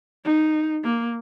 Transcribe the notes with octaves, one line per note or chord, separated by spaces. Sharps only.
D#4
A#3